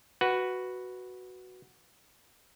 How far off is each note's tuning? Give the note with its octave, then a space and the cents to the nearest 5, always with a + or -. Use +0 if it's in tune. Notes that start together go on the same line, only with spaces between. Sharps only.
F#4 +0 B4 +0